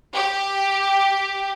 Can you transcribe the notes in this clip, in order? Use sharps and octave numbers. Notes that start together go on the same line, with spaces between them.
G4